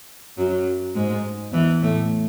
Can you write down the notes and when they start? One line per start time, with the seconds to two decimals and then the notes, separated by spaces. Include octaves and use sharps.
0.38 F#2 F#3
0.96 G#2 G#3
1.53 E2 E3
1.82 A2 A3